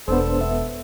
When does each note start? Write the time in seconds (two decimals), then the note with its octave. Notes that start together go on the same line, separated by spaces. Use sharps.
0.08 E1 B3 D4 A4 C5
0.41 B3 E5